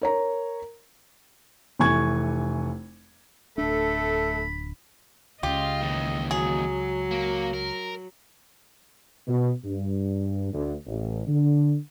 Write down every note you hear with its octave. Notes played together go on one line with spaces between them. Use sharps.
A#4 C#5 A#5
F1 E3 G#5 C#6 G#6
D1 A3 D4 A4 B5
C#2 C#3 F4 G4 D#5
D#2 E3
F#3 G#4
A#3
A#4
B2
G2
D2
A1
D3